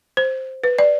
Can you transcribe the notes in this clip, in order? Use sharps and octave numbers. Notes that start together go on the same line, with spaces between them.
C5
B4
D5